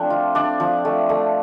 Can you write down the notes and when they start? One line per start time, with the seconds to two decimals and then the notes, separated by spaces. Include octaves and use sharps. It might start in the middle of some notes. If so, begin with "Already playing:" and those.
Already playing: F3 A3 C4 D4
0.10 F4
0.35 D4 D5
0.60 F3
0.85 A3
1.09 A3